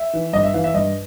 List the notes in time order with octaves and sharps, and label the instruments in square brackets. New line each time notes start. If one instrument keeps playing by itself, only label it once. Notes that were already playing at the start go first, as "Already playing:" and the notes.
Already playing: [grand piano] E5
E3
G2 D#5
E5
E3 F5
E5
G2 D#5